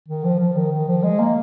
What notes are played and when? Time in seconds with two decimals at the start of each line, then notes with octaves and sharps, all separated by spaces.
0.08 D#3
0.24 F3
0.40 F3
0.56 D#3
0.72 D#3
0.88 F3
1.04 G#3
1.19 A#3